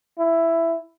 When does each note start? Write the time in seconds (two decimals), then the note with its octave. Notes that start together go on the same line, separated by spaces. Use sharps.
0.19 E4